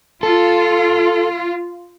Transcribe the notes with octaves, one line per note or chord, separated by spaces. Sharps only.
F4 A4